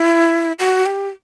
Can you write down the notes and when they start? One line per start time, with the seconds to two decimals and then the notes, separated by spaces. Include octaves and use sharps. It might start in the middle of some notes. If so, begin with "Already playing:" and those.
Already playing: E4
0.59 F#4
0.86 G4